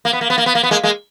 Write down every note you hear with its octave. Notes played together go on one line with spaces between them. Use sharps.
A#3
B3
A#3
B3
A#3
B3
A#3
B3
G#3 A#3
G#3 A#3